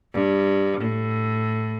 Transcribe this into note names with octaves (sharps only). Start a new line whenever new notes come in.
G2
A2